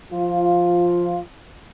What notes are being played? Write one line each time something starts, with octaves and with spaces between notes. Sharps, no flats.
F3 F4